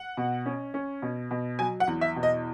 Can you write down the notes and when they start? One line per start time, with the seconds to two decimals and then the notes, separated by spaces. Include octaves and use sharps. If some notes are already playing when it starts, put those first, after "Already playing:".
Already playing: F#5
0.17 B2
0.46 C#4
0.74 C#4
1.02 B2
1.31 B2
1.59 F#3 G#5
1.80 F#5
1.87 E2
2.01 E5
2.16 B2
2.23 D#5